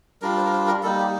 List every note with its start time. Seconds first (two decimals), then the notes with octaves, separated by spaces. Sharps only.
0.22 G3 D4 F4 A#4
0.37 C5
0.45 A#4
0.53 C5
0.67 A#4
0.83 G3 A#3 D#4 A4
0.99 G4